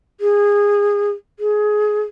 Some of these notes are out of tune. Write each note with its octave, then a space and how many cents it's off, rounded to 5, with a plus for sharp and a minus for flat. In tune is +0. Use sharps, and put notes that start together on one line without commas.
G#4 -20
G#4 +20